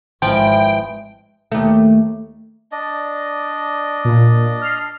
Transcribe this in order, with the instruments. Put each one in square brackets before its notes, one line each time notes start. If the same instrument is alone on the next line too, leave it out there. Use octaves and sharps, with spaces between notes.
[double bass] G#1 G#3 [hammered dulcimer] E3 [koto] F3 [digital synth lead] G5
[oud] D#2 A3
[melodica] D4 D5 D#5
[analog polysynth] A#2
F6 C7